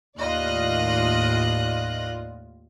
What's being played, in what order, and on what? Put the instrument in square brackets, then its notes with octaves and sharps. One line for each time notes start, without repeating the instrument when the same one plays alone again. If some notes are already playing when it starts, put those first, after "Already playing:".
[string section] D#2 A2 F4 D5 D#5 F#6